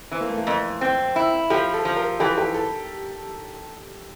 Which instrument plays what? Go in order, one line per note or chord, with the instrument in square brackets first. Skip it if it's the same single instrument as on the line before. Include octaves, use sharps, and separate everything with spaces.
[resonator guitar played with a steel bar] E3 [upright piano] C4
[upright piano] A#3
A3
A#3
[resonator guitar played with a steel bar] F2
C4
E4
[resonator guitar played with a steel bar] F3 [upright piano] G4
[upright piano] A4
[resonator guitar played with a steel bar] F3
[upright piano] A#4
[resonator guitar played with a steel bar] E3 [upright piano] G4
[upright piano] G4
A4